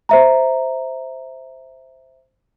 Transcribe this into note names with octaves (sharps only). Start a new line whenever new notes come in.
C5 E5 A#5